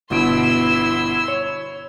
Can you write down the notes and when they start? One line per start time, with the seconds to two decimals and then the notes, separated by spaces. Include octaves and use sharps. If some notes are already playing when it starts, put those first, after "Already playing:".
0.10 G1 B2 E4 C6 E6 D7
1.28 C#5